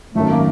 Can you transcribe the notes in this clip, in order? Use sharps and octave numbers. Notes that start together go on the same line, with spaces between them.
G#1 F#2 D#3 A3
A#3